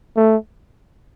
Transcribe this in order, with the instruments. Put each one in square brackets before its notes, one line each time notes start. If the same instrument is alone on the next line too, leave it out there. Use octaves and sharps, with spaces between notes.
[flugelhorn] A3